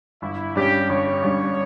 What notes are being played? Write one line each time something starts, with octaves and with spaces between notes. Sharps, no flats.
G1 E4
G2 G3 C#4 G4
G1 C#5
G2 G3 C#4